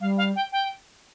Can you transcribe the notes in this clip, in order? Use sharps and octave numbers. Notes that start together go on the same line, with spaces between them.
G3 F5
F5
G5
G5